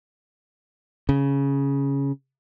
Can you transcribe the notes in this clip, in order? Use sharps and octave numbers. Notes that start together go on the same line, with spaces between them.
C#3